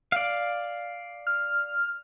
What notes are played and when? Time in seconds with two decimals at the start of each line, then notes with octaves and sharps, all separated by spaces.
0.12 D5 F5
1.27 F6